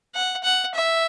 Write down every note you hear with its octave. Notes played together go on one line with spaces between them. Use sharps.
F#5
F#5
E5